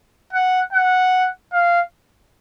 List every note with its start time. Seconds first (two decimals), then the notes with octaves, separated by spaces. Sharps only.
0.33 F#5
0.73 F#5
1.53 F5